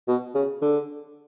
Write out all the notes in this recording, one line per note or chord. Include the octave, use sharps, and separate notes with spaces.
B2
C#3
D3